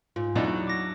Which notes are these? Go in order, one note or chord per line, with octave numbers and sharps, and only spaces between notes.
G#2 F4
E2 F#3 D4 D#4
D6 A#6